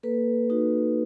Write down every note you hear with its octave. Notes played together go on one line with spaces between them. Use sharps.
A#3 A4 B4
D#4 F#4